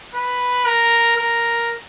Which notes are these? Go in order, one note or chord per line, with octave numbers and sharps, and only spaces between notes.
B4
A#4
A#4